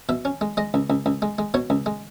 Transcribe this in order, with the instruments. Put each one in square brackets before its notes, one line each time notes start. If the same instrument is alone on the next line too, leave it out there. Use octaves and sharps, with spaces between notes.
[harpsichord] B2 E5
C#4
G#3
G#3 D#5
C#2
C#2
C#2
G#3
G#3
B2 C#5
C#2
G#3